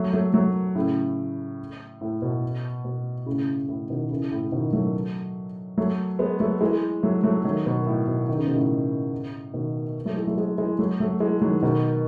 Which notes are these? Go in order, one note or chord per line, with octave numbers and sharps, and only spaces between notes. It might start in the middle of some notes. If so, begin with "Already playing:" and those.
Already playing: F#3 A3
F#3 A3
F#3 A3
A2 C#3
A2
B2
B2
A2 C#3
A2 C#3
B2 D#3
C#3 E3
A2 C#3
B2 D#3
F#3 A3
F#3 A3
G#3 B3
F#3 A3
E3 G#3
F#3 A3
F#3 A3
D#3 F#3
B2
A2
B2
D#3
C#3
B2
A2 C#3
B2 D#3
F#3 A3
E3 G#3
F#3 A3
E3 G#3
E3 G#3
F#3 A3
F#3 A3
E3 G#3
D#3 F#3
B2 D#3